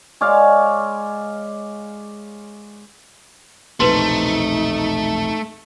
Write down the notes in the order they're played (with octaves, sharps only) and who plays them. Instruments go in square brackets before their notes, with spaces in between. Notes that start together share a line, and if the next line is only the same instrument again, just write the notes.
[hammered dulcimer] G#3 C#5 D5 F5
[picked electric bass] E1 A#1 C3 [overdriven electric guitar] A3 [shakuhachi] D#4 [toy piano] B4 C6